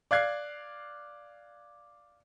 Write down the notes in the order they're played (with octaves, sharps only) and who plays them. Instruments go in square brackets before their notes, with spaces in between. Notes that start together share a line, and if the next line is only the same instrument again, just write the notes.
[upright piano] D5 F5 F#6 G#6 C7